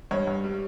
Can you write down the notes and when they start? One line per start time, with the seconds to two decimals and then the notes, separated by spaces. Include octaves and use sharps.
0.11 G2 C#5
0.27 G2
0.44 G3